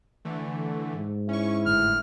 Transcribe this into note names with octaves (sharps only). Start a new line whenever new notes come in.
D3 E3 A3
G#2
C#4 E4 C#6
G1 A2 F6